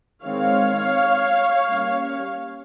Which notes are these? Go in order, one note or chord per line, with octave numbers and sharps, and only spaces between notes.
D#3 G#3 C4 C#5 F5
G3 A#3 C#4